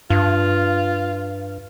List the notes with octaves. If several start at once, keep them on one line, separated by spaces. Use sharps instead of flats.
G2 F4